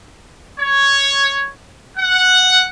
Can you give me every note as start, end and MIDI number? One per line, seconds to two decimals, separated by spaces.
0.60 1.46 73
1.98 2.67 78